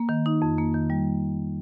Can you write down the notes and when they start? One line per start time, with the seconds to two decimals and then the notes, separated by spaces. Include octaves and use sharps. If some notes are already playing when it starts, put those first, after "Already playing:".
Already playing: A#3
0.09 D#3
0.26 D#4
0.42 F2
0.58 A#3
0.74 D#3
0.90 G3